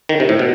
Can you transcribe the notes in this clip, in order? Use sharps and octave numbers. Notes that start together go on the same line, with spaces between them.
D#3
C3
A2
B2